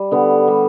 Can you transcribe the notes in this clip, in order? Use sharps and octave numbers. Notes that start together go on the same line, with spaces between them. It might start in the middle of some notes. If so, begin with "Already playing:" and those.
Already playing: G3
D3 B3
G3